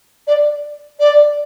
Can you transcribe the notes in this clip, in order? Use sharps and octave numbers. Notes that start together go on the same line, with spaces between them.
D5
D5